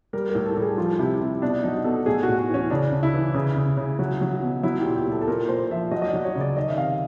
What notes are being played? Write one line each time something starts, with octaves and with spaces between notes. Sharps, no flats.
G3 A#4
A2 A#4
A4
G3
G#4
F3 F4
C3 E4
C3
B2 D4
F#3 D#4
B2 A4
A2 G#4
F#4
A2
F#4
E3 C#4
C#3 D4
C#3
E4
E3
C#3
C#3
C#3
F#3
F#3
B2
F#3 E4
A#2 G4
G4
A#2 A4
A4
A#2 A#4
A#2 C5
F3 E5
F#3 D#5
D#5
D5
F#3
C#5
C#3
D5
D#3 D#5
E5
C3 F5